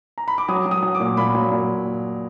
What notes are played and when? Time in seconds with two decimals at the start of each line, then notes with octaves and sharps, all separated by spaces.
0.18 A#5
0.28 B5
0.38 D6
0.49 F#3 D#6
0.65 F#3
0.71 D#6
0.83 F#3
0.95 D6
1.00 A#2
1.17 A#2 B5
1.35 F#3
1.52 A#2